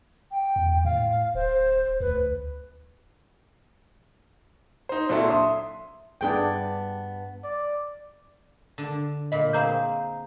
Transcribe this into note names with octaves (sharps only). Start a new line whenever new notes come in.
G5
E2
A2 F5
D1 C5
D2 B4
D#4 C5
A#2 F#3 C4 D4 E4 A4
E5 C6 D#6
G2 B3 D4 G#4 G5
D5
D3
A#2 D#5 B5
A#3 C4 G#4 F5 A#5 G6